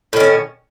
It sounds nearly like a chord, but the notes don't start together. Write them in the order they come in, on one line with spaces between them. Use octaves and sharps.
A2 D#3 C#4